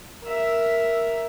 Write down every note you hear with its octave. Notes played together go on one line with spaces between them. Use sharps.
A#4 E5